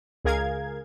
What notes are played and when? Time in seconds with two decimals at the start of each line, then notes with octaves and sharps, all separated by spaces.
0.25 C#2 G#4 A#4 F5 G#6